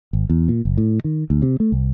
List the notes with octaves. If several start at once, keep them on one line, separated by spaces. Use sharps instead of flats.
G#1
E2
A#2
F#1
A2
D#3
D2
C3
A3
C2